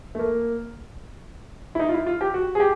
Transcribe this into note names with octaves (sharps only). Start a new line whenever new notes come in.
A3
A#3
E4
D#4
F4
E4
F4
G4
F#4
G#4
G4